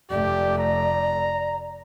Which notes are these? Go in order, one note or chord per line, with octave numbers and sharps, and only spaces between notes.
F1 A3 G4 D5
A#5